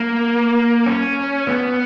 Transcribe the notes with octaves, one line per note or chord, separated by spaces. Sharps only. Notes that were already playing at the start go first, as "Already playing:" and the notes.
Already playing: A#3
C#4
B3